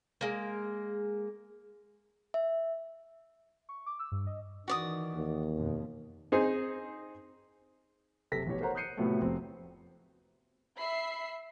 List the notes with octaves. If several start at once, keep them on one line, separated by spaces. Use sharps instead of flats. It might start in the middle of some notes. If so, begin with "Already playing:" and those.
G#3 A#3
E5
C#6
D6
E6
G2
D#5
D#3 E3 F#4 D5 D#6
D#2
F2 B2
C4 D#4 G#4
F#1 C3 A4 A#6 B6
A1 B2 E3 G4 C#5
A4 A#4 C5 C#5 F#5 A#5
D#6 F#6 G6 C7 C#7 D#7
A2 C3 F3 F#3 A3 B3
F1 C4
E5 B5 C7